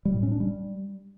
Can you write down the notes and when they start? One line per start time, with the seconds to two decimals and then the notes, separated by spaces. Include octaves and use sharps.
0.05 G3
0.14 A2
0.23 C#4
0.31 D4
0.40 G3